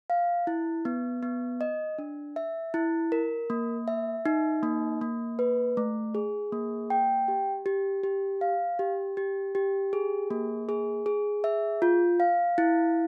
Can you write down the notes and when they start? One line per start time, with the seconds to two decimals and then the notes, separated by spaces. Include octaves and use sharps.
0.10 F5
0.47 E4
0.85 B3
1.23 B3
1.61 D#5
1.98 D4
2.36 E5
2.74 E4
3.12 A#4
3.50 A#3
3.88 E5
4.26 D#4
4.63 A#3
5.01 A#3
5.39 B4
5.77 A3
6.15 G#4
6.52 A#3
6.90 G5
7.28 G4
7.66 G4
8.03 G4
8.41 F5
8.79 G4
9.17 G4
9.55 G4
9.93 G#4
10.31 A#3
10.69 G#4
11.06 G#4
11.44 E5
11.82 F4
12.20 F5
12.58 E4